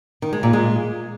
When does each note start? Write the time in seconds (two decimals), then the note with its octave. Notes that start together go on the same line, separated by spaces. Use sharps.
0.22 D#3
0.33 G#3
0.43 A#2
0.53 G#3